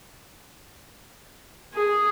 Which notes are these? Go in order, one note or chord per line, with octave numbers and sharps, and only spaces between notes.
G#4